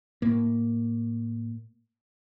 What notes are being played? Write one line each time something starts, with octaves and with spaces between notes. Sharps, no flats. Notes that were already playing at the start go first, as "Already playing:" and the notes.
A2 A#3